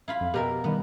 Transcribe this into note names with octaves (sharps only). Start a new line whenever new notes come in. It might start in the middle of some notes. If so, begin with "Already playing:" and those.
E4 F4 B5
F2
B2 G4 A#4 E5
G2 D#3 G3 B3